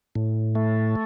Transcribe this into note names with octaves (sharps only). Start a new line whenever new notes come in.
A2
A3